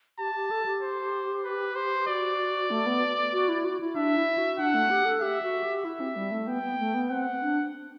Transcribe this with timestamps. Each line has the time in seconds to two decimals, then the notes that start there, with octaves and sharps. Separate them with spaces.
0.19 G4 A5
0.35 G4
0.51 A4
0.66 G4
0.82 C5
1.44 B4
1.75 C5
2.07 F#4 D5
2.71 A3
2.86 B3
3.33 F#4
3.49 E4
3.65 F#4
3.80 E4
3.96 D4 E5
4.17 E4
4.38 F#4
4.59 D4 F#5
4.74 A3
4.90 G4
5.05 A4
5.22 G4 E5
5.42 F#4
5.64 G4
5.84 E4 E5
6.00 C4
6.16 G3
6.31 A3
6.47 B3 G5
6.63 B3
6.79 A3
6.94 B3
7.10 C4 F#5
7.42 D4